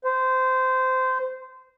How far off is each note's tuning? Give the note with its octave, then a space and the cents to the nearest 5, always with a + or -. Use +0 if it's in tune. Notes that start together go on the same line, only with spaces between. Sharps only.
C5 -20